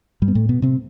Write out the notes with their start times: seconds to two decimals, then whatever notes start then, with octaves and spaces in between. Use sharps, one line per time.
0.22 G2 G3
0.28 B3
0.35 A2 A3
0.49 B2 B3
0.62 C3 C4